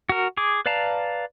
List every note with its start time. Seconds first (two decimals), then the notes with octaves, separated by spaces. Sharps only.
0.09 F#4 A#4
0.37 G#4 D6
0.66 B4 D5 F5 A5 A#5